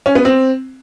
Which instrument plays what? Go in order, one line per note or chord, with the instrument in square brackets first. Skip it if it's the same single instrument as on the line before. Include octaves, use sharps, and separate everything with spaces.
[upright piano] C#4
B3
C4